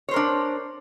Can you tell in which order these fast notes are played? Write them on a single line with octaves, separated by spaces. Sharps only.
C#5 C5 A#4 D4